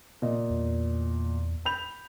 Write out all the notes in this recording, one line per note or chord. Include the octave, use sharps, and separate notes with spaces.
A#2 D#5
E2
B5 G6 F7